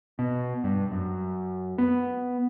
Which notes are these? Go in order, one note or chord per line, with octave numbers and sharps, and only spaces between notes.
B2
G2
F#2
B3